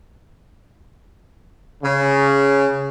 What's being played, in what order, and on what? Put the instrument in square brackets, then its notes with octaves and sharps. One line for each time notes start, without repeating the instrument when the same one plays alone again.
[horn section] C#3